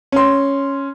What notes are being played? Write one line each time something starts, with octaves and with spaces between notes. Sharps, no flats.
C#4 C6